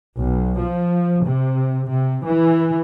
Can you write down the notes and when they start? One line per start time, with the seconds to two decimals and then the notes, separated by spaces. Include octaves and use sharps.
0.17 B1
0.61 F3
1.25 C3
1.88 C3
2.26 E3